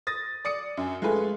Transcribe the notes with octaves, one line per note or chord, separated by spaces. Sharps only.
D#6 A6 A#6
D5 D#6 C#7
F#2 G#5
G#3 A3 F4 A4 B4 G#5